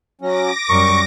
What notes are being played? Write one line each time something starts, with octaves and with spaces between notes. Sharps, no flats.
F#3 C#4 D6 A#6
F#2 G3 A#4 C#6